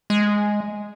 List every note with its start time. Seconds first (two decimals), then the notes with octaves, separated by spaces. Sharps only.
0.10 G#3